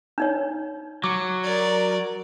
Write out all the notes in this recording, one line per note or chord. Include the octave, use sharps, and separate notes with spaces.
D4 D#4 C#5
F#3 D6
A#4 D5